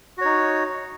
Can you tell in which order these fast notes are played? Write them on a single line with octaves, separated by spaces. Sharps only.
F#4 C#5 D#4